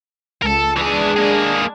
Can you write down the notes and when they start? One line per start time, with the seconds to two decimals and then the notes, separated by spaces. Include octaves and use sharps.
0.42 C#2 A4 A#4 A5
0.77 E3 G#3 D4 G#4
1.17 A#3 G#4